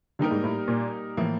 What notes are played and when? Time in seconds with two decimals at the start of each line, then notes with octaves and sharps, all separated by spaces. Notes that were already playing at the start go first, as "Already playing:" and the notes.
0.19 D3 G3 A#3 D#4 G4 A#4
0.31 G#2
0.44 A2
0.68 A#2
1.17 A2 E3 F3 A#3